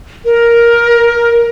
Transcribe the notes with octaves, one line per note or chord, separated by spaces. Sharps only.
A#4